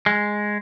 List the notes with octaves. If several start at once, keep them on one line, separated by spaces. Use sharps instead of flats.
G#3